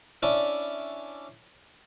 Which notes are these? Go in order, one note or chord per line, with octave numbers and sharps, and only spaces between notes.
C#4 D4 E4 D5